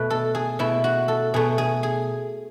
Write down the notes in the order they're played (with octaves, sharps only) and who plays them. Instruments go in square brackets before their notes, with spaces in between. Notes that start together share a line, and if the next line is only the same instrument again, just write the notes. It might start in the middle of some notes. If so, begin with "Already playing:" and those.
Already playing: [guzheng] B2 A3 B4
A4
G#4
B2 A3 E4
F#4
A4
B2 A3 G#4
G#4
G#4